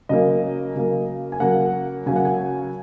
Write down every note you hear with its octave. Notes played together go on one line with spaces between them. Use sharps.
C#3 F#3 A#3 D#5
C#3 F#3 A#3
G#5
C#3 F#3 A#3 F#5
C#3 F#3 A#3 G#5
F#5
G#5